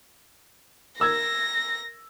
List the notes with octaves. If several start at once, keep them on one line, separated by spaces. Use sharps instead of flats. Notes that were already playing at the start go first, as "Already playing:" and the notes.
A#4 E6 G#6 A#6